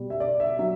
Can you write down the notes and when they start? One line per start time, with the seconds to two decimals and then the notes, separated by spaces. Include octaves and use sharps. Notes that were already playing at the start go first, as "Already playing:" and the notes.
Already playing: B2 G3
0.10 E5
0.20 D5
0.40 E5
0.59 F#3 E5